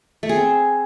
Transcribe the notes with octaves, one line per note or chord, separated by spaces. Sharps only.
A3
G#4
C4